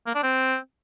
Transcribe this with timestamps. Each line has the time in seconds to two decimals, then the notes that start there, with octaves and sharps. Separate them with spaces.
0.07 A#3
0.15 D4
0.23 C4